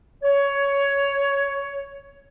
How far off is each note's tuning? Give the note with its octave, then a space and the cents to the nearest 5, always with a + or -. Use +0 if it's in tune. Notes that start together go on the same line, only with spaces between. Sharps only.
C#5 +10